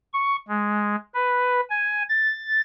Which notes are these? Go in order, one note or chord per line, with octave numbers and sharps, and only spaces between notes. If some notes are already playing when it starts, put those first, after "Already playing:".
C#6
G#3
B4
G#5
A6